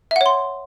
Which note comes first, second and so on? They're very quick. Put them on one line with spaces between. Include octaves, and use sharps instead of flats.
E5 F#5 C#5 C6